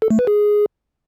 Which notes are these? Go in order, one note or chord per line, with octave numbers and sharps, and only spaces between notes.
A4
A3
B4
G#4